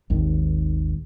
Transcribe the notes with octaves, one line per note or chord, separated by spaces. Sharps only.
G#1 D#2